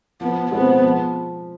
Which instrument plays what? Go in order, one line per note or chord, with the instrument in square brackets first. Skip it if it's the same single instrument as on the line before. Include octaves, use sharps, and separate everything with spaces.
[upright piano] F3 [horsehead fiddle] B3
[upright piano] G#3 C4 [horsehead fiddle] B3
[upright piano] F3